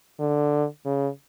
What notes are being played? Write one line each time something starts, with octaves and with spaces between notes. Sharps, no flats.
D3
C#3